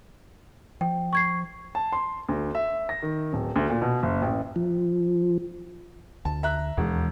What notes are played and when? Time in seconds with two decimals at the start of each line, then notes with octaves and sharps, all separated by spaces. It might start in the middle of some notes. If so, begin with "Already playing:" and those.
0.81 F3 G5
1.13 C#6 G#6 C7
1.75 A5
1.93 C6
2.29 D2
2.55 E5
2.89 A#6
3.02 D#3
3.33 D1
3.56 D2
3.70 A#2
3.82 B2
4.03 F#1
4.22 A1
4.56 F3
6.25 D2 A5
6.43 E5 A#5 F#6
6.77 E1 D#2 E3 G#3